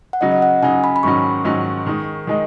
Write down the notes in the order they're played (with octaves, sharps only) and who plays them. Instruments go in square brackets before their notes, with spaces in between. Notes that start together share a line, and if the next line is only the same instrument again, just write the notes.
[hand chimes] F#5
[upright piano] C#3 F#3 D#4 [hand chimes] D#5
[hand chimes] D#5
F#5
[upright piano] C#3 F#3 D#4 [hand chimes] G#5
[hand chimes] B5
B5
[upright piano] G#2 D#3 F#3 C#4 [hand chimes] C#6
[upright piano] G#2 D#3 F#3 C#4
D#3 G#3 D#4
D#3 G#3 D#4